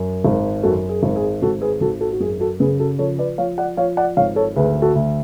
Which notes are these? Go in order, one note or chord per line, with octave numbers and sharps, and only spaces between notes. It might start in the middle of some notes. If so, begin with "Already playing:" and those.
Already playing: F#2
G#1
F#2 F#4 A4
G#4
G#1
G#4
G#1 F#4 A4
G#4 B4
G#1 F#4 A4
F#4 A4
F#4
F#2 G#4
F#4 A4
C#3 G#4 B4
F#4 A4
F3 A4 C#5
B4 D5
F3 C#5 F5
D5 F#5
F3 C#5 F5
D5 F#5
G#1 C#5 F5
A4 C#5
D2 G#4 B4
F#4 A4
D2